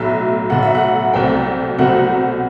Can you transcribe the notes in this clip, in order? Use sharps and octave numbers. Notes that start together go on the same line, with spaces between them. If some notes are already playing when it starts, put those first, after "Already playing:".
Already playing: B1 A2 F#3 E5
B1 A2 F#3 F#5
E5
F#5
C2 B2 F#3 A3 C4 G5
C2 B2 F#3 A3 C4 F#5